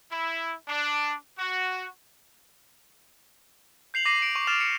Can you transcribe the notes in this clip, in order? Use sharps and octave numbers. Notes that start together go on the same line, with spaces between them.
E4
D4
F#4
G6 C7 F7 F#7
D6 A#6 C7 D#7
D7
C#6
C#6 F6 A6 E7 F7
C#7